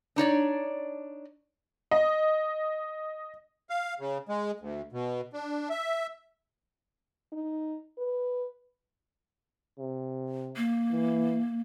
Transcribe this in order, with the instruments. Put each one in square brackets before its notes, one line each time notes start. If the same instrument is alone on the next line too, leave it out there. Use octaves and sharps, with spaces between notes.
[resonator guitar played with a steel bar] D4 D#4 C#5 D5
[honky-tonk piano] D#5
[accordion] F5
C#3
G#3
D2
B2
D4
E5
[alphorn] D#4
B4
[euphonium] C3
[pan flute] A#3
[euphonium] E3